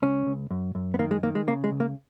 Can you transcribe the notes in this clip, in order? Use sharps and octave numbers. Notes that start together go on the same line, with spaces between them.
C#2 C#4
C#2
F#2
F#2
B3
D#3 A#3
G#3
D#3 A#3
G#3
C#3 A#3
G#3
C#2
A#3